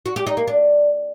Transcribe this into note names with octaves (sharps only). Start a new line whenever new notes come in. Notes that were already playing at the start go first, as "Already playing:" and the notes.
F#4
G4
D#4
A#3
D4